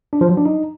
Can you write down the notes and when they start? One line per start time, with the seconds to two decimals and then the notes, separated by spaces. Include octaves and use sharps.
0.13 D4
0.21 F3
0.29 F#3
0.37 D4
0.45 D#4